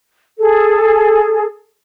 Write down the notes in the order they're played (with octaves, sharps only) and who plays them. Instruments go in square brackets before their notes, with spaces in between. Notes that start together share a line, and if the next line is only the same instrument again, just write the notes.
[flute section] G#4 A4